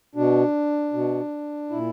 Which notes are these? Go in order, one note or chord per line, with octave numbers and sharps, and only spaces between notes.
B2 D4
B2
A#2 E4